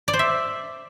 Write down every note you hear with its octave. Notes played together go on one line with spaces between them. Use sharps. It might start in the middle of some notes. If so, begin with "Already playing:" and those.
D5
C5
E5